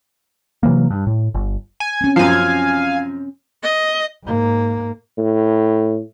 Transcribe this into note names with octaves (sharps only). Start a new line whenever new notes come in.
C3 E3 F#3 A#3
G2
A2
G1
G#5
C4 C#4
F#2 F3 F5 G#5
D#5
G#2 A#3
A2